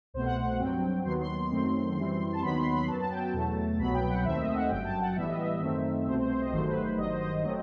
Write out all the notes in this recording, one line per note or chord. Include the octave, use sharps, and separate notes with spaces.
C2 B2 A3 C5
F#5
F#5
F#5
G2 F#3 C4 G5
D#2 D#3 F#3 B3 C6
C6
F#2 D#3 F#3 A3 C4
F#2 E3 G3 C4
A5
D#2 D#3 F#3 B3 B5
C6
B5
F#2 F#3 B3 A5
A5
G5
A5
E2 B2 F#3 A3
C2 B2 F#3 B3 B5
G5
F#5
D#2 D#3 A3 C4 E5
D#5
F#5
G1 F#2 F#3 G5
A5
F#5
A2 E3 G3 B3 E5
D#5
E5
F#2 D#3 A3 C4
C2 B2 A3 C4 C5
C5
C5
D#5
G1 G2 D#3 F#3 A3 C5
B4
C5
G1 G2 D#3 F#3 D#5
C5
D#5
F#3 A3 C4